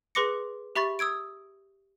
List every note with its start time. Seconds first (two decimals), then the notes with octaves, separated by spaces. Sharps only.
0.15 G#4 B4 C6 D6 A#6 C#7
0.76 G4 E5 B5 C#6 A6
0.99 D#6 E6 G#6 D7